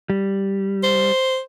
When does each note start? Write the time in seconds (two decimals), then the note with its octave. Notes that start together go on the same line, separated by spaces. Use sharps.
0.10 G3
0.83 C5